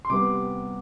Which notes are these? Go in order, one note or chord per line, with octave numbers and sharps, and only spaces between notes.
C6
C3 G3 B3 D6